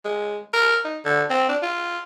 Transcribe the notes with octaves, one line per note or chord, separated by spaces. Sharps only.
G#3
A#4
D#4
D3
C4
D4
F4